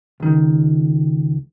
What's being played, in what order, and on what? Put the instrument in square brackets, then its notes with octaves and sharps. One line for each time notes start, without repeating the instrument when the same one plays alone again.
[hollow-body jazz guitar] C#2 D#3